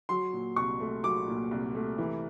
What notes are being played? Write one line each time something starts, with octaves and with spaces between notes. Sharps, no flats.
F#3 C6
A#2
C2 C#6
A3
F#3 D6
A#2
C2
A3
E3